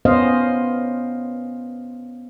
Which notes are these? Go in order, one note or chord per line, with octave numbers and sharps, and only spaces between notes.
B3 C#4 C5 D#5 F5